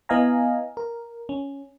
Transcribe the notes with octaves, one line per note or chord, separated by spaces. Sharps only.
B3 E4 D#5 F5 G#5 A#5
A#4
C#4